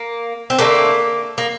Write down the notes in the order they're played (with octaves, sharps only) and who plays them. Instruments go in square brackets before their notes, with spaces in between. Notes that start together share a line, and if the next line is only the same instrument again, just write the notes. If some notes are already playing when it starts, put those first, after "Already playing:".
Already playing: [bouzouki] A#3
C4
D3 A3 A#3
A#3